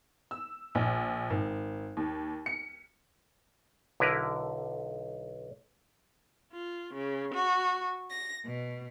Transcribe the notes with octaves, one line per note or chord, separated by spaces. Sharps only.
E6
A#1
G#1
D#2
C#7
B1 D3 E4 A#4 B4
F4
C#3
F#4
A#6
B2